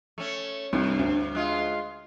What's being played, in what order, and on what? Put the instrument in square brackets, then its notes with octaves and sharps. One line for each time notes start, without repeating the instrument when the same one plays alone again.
[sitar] A3 C#4
[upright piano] C2 [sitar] G2
[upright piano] D2
[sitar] G#3 F4